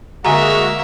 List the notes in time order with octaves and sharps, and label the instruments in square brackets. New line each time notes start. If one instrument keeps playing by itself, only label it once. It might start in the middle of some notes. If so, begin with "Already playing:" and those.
[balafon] D3 G#5 A#5 [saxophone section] G#3 F#4 [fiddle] A#3 E5